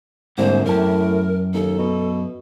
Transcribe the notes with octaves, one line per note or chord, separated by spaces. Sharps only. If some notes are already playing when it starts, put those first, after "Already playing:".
C2 G#2 D3 A#3 C5
F#2 A2 A#4 A5
D#2 A4
B2